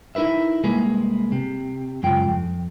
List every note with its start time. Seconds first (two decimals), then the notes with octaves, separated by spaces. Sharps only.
0.15 D#4 E4 A#4 B4 E5
0.63 C2 G#3 A#3 G#4 B4
1.32 C3
2.03 F#2 C#3 G#3 F4 G5
2.28 F2